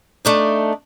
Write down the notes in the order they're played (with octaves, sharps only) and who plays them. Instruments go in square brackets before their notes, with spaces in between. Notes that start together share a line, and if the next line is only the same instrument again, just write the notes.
[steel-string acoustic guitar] A3 D4 D#4